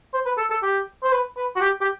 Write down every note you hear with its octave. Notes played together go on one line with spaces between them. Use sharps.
C5
B4
A4
A4
G4
C5
B4
B4
F#4
G4
G4